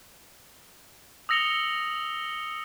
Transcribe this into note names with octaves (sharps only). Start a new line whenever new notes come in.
D#6 E6 A#6 C#7 F7 G7